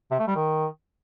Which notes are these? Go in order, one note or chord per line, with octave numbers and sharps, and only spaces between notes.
C3
A3
G3
D#3